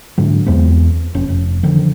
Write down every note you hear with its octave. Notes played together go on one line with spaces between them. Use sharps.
G#2 D3 F#3
E2 G#3 B3 C4
F1 C#4
F1
D3 D#3 F3